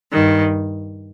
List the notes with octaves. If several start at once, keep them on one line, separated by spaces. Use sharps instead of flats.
G2 D#3